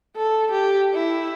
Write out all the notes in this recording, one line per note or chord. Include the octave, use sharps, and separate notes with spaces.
A4
G4
E4